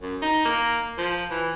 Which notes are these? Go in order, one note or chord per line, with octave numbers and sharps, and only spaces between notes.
F#2
D#4
A#3
F3
E3